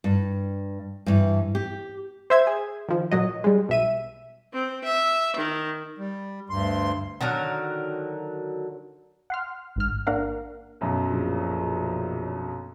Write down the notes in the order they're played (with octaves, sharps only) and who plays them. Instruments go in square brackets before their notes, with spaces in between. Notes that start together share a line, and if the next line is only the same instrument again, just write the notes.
[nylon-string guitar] G2
G2 E3
G4
[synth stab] C5 E5 G#6
G#4
D#3 F3
A#2 F#3 D#5
G3 G#3
B1 E5 D#7
[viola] C4
E5
D#3
[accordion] G3
D2 G2 C6
[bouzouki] D3 D#3 F#3 A#4
[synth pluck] F#5 C6 F6
A1 G#2 F6
A#3 D4 A#4 F5 F#5
[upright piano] B1 F#2 B2
[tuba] A#1